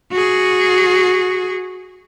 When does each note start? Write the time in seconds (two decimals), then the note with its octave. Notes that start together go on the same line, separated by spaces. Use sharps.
0.12 F#4 G#4